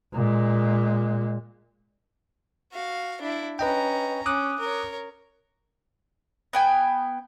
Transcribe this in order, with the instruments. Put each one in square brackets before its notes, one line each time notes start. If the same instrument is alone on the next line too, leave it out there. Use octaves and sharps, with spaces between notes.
[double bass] A#2 G#3
[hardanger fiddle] F#4 F5
D4 E4
[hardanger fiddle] C#4 A#5 [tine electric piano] B4 D#5 G5
[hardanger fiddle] C#4 [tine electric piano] D6 D#6 F#6
[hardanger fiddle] A#4 C#5
[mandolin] B3 G5 G#5